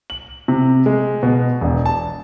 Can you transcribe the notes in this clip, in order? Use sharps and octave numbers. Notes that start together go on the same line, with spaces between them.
F#7
C3
G#3
B2
E1
A5